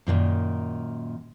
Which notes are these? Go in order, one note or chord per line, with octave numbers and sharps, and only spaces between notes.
F#2 A#2 D3 D#3